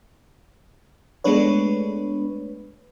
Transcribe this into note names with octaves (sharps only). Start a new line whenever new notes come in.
G#3 A3 B3 D4 B4 C#5